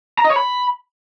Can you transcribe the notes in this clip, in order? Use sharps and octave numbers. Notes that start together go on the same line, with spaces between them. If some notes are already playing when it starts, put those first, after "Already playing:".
A#5
D#5
C#5
B5